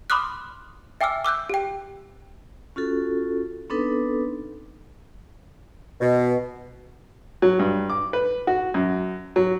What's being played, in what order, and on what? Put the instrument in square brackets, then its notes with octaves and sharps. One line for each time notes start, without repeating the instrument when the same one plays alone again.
[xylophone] B5 C6 D6 D#6 F6 F#6
E5 G5 G#5 D6 E6 F6
D6 E6 F#6 G6
G4 G5
[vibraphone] C#4 F4 F#4 A4
B3 C4 D4 D#4 A4 B4
[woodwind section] B2
[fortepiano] F#3
G2
D6
B4
F#4
F#2
F#3